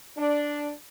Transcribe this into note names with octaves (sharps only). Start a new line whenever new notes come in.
D4